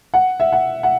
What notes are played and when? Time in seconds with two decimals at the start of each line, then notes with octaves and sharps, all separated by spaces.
0.14 F#5
0.40 E5
0.52 F#5
0.83 F#5